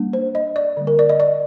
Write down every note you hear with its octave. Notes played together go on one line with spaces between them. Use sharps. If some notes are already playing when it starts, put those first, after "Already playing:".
Already playing: G3 A#3 D4
C5
D#5
D5
D3 G3 A#3
A#4
D5
D#5
D5